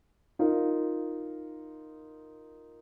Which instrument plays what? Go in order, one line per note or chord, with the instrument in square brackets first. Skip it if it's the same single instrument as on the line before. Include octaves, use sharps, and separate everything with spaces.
[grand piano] D#4 F4 A#4